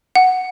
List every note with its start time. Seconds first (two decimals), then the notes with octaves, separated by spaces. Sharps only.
0.15 F#5